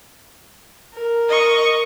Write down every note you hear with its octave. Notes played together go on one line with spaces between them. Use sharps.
A#4
D#5 C#6